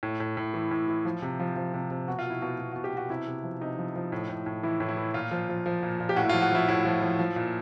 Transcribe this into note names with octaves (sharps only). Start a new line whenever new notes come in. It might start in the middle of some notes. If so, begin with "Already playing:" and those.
A2
A2
A2
E3
A2
E3
F3
C3
F3
F3
C3
C3
B2 F#4
F4
B2
E4
B2 F4
B2
F#4
B2
G4
B2 F#4
C3 E4
C3
F3
C3 D#4
F3
F3
A2
A2
A2
E3 E4
A2
E4
E3
A#2 F4
F3
F3
F3
A#2
A#2
G4
A2 F#4
E4
F4
F3
F#4
F3 E4
A2 E4
F3
F3
F3
A#2